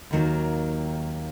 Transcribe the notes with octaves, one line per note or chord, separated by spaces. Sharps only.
D#2 D#3 F#3 A#3